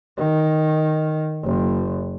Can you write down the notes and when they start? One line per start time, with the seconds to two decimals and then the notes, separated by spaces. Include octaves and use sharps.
0.18 D#3
1.43 F#1